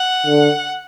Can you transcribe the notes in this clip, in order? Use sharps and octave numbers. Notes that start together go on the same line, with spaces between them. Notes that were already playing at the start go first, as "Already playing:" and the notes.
Already playing: F#5
D3